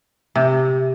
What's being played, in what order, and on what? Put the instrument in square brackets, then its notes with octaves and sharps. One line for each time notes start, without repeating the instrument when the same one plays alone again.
[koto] C3